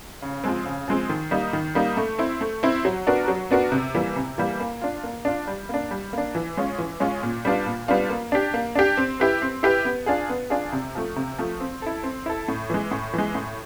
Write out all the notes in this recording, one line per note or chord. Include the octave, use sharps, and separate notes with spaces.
C#3
F3 G#3 C4
C#3
F3 G#3 C4
D#3
G3 A#3 D#4
D#3
G3 A#3 D#4
A3
C4 E4
A3
C4 E4
F#3
B3 D4 F#4 A#4
F#3
B3 D4 F#4 A#4
C3
E3 G3 A#3
C3
E3 G3 A#3
A#3
D4 F4
A#3
D4 F4
G3
A#3 D4
G3
A#3 D4
E3
G#3 C#4 F4
E3
G#3 C#4 F4
A#2
G3 B3 D4 F4
A#2
G3 B3 D4 F4
A#3
D4 G4
A#3
D4 G4
C4
E4 G4 B4
C4
E4 G4 B4
B3
D4 F4 G#4
B3
D4 F4 G#4
C3
F3 A3
C3
F3 A3
C4
E4 A4
C4
E4 A4
A2
E3 G#3
A2
E3 G#3
A2